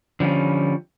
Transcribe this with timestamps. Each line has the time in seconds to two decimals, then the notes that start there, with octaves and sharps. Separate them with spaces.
0.20 D3 F3 G3 C#4